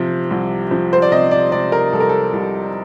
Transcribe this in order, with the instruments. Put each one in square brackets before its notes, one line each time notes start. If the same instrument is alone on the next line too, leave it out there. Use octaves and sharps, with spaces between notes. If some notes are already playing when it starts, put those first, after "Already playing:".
Already playing: [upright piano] C3 F3
C2
F3
C5
D5
C3 D#5
D5
C3 D5
A#4
C2 A4
A#4
A4
C2